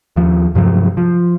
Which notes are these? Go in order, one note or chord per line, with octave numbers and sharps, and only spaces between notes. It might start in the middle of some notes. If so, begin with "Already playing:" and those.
D#2 F3
G2 C3 F3 F#3
F3